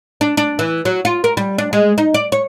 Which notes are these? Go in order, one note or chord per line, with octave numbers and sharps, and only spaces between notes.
D4
D4
E3
F#3
F4
A#4
G3
D4
G#3
D#4
D5
C#5